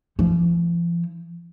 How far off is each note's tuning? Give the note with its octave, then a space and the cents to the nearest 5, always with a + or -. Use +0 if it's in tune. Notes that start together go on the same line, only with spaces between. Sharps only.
F3 -40 D#4 +15